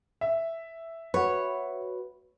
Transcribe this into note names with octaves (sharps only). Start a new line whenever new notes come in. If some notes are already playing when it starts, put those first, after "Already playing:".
E5
F#4 B4 C#5